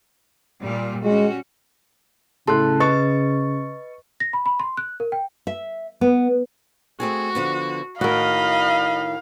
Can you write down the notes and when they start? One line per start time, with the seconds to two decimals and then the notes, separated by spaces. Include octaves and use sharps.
0.61 A#2 G3 F4
1.04 G3 G#3 C#4 F#4
2.47 A2 C#3 A4 A5 C6 F#6
2.80 B4 D#5 C#6 A6
4.20 A#6
4.33 B5
4.46 B5
4.60 C6
4.77 F#6
5.00 A#4
5.12 G5
5.47 E5
6.01 B3
7.00 A3 C4 F#4 G#4
7.35 D3 F3 B3
8.01 A2 D#3 F#4 A#4 D#5 F5 B5